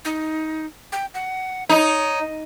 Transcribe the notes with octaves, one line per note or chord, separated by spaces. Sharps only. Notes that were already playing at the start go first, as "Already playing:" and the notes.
D#4
G5
F#5
D#4 C#5